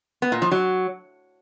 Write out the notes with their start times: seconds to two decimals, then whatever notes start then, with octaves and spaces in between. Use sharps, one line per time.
0.22 B3
0.32 A#2
0.42 F3
0.52 F#3